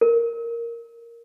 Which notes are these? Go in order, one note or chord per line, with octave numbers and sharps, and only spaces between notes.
A#4